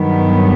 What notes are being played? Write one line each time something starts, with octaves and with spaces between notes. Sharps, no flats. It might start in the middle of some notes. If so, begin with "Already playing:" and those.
Already playing: G2 D#3 F#3 B3